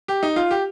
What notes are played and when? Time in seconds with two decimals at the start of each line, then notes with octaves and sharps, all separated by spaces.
0.08 G4
0.23 D#4
0.36 F4
0.51 G4